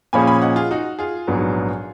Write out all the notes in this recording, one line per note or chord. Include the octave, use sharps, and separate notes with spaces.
A#2 F3 A#3 C#4 G#4 G#5 B5
G#5 B5
D#5 F#5
F4 G#4
D#4 F#4
F4 G#4
A#1 G#2 F#3 B3